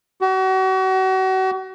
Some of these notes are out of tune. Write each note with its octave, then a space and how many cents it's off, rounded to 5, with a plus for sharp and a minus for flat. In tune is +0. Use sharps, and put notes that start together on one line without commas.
F#4 +35